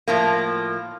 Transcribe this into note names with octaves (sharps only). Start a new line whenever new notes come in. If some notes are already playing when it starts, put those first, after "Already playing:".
A2 F3 A#3